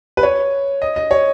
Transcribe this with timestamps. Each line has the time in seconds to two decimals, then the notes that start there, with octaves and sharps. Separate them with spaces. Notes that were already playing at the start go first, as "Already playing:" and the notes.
0.17 B4
0.23 C#5
0.82 D#5
0.96 D#5
1.11 C#5